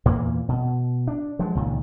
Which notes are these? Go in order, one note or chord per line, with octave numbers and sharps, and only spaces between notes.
E2 A#2 E3 A#3
B2
D4
F3 F#3 G#3
C#2 A#2 D#3